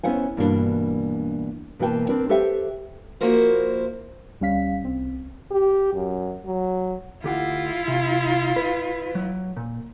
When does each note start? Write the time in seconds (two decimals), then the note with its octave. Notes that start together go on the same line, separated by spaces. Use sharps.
0.03 B3 C#4 E4 C5 F#5 G#5
0.37 G2 B2 E3 A#3 C#4 D4
1.79 B2 E3 A#3 B4 G5 A5
2.09 C4 D4 A#4 B4 D5
2.29 G4 A4 B4 C5 E5 G5
3.21 F3 A#3 E4 F#4 A#4 C5
4.41 D2 G3 C#4 F5 B6
4.83 C2 C4
5.51 G4
5.93 F#2
6.45 F#3
7.24 D2 E4 F4 G4 F#5
7.88 C3
8.56 B4
9.15 F#3
9.57 A#2